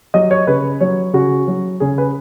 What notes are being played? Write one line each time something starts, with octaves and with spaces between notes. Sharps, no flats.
F#3 D#5
C#5
C#3 B4
F#3 C#5
C#3 F#4
F#3
C#3 G#4
B4